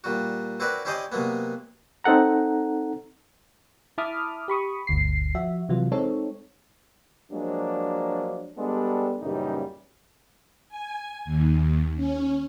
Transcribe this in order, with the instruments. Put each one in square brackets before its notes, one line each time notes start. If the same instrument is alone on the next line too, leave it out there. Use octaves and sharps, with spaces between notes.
[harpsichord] A#2 G3 F#4
C4 E4 F#4 A#4 B4 D5
C#4 E4 G4 C5 D5 D#5
C3 F#3 G#3 A#3 B3
[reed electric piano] C4 D#4 A4 F#5 A#5
[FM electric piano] E4 A5 B5 D6 D#6 F6
G4 B5 C#6 D#6
G1 D2 C7
F3 F#4 E5
C3 E3 F#3 F4
G#3 C4 D#4 A4 C#5
[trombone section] F3 F#3 G#3 A#3 D4
G3 G#3 B3 D4 G4 A4
F#2 A#2 C#3 E3 G3 D#4
[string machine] G#5
D#2
C#4